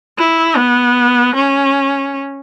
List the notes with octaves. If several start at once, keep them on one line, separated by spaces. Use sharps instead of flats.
E4
B3
C#4